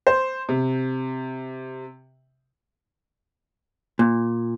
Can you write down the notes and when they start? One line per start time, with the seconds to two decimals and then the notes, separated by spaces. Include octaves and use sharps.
0.07 C5
0.49 C3
3.99 A#2